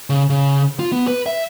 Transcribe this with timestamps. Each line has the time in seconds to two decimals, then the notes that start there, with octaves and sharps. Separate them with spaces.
0.10 C#3
0.30 C#3
0.79 F4
0.92 B3
1.08 B4
1.26 E5